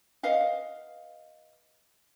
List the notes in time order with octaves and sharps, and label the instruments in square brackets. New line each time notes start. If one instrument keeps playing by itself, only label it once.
[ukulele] B4 D#5 F5 F#5